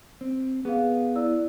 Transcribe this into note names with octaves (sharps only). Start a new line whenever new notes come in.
C4
B3 G#4 F5
E4 D5 E6